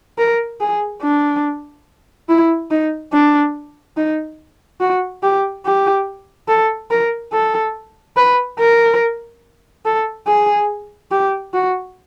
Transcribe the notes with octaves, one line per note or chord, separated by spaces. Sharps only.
A#4
G#4
D4
E4
D#4
D4
D#4
F#4
G4
G4
A4
A#4
A4
B4
A#4
A4
G#4
G4
F#4